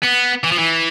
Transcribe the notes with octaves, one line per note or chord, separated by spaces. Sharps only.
B3
E3
F3
E3